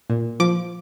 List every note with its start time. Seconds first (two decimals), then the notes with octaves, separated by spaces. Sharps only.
0.10 A#2
0.40 F3 D6